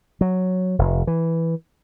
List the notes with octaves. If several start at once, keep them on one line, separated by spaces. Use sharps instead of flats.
F#3
F1
E3